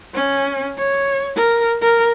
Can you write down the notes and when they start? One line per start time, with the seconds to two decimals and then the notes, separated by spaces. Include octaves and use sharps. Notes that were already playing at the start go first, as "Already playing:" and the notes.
0.14 C#4
0.78 C#5
1.36 A#4
1.81 A#4